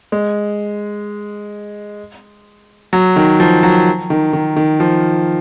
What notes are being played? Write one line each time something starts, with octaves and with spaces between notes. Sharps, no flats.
G#3
F#3
D#3
F3
F#3
D#3
D#3
D#3
F3